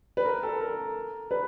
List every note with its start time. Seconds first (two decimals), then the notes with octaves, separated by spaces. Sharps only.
0.17 B4
0.25 A#4
0.43 A4
0.61 A#4
1.31 B4